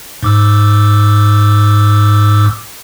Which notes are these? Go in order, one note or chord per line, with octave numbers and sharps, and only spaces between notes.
G#2 D6 E6